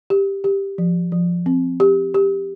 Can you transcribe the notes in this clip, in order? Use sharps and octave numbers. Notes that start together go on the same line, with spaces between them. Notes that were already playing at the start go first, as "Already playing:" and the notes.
G4
G4
F3
F3
C4
G4
G4